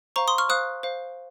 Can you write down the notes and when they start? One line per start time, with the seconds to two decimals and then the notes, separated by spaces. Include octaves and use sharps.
0.16 C5 F5 A#5 C#6
0.28 C6 D#6
0.38 C#6 F6
0.49 C5 F5 D#6 F#6
0.83 C5 F5